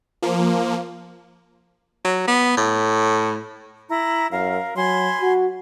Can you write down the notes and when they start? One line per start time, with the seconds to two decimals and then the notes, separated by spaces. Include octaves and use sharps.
0.22 F3 A#3
2.05 F#3
2.28 B3
2.57 A2
3.88 E4 A#5
4.31 F#2 A#4 F5
4.76 F#3 G#5 B5 C6
5.21 F#4